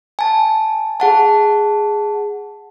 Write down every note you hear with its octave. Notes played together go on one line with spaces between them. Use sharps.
G#5 A5
G#4 F#5 A5